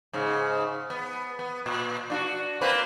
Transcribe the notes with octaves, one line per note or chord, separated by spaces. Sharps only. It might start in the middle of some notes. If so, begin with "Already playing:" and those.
G#2 C#3
B3
B3
A#2
D4 F4 F#4
A#3 C4 B4